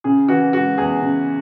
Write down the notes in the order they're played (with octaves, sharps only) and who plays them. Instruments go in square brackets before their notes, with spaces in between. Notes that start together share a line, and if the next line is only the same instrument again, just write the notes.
[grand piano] C#3 G#4
E3 F#4
G#3 F#4
E2 G#4
C#3